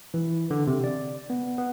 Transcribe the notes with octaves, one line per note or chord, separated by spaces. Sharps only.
E3
D3
C3
D5
B3
B3